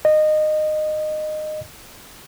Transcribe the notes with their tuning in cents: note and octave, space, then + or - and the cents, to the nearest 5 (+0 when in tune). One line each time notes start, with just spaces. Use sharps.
D#5 -20